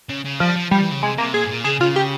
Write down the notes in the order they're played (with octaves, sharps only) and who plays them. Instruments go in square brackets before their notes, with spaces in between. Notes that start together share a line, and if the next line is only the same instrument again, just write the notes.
[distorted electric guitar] C#3
C#3
[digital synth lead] F3 [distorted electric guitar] G3
[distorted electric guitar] F3
[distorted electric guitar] F3 [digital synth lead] G3
[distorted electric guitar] E3
C#3
[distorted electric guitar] C3 [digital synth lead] G#3
[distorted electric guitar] C3 [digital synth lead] A#3
[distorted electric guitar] A#2 [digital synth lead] G#4
[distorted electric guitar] G#2
A#2
[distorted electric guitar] C#3 [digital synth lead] G#4
[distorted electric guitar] C#3 [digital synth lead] F4
[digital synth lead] G4